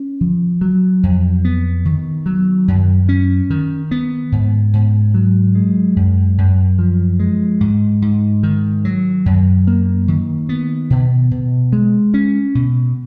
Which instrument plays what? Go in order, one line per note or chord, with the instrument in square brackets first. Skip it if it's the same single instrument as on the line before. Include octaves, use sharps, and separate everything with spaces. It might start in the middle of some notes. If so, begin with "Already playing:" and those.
Already playing: [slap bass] C#4
F3
F#3
F2
B3
D#3
F#3
F#2
C#4
D#3
B3
G#2
G#2
F#3
G#3
F#2
F#2
F3
G#3
G#2
G#2
D#3
F#3
F#2
A#3
D#3
B3
B2
B2
G#3
C#4
B2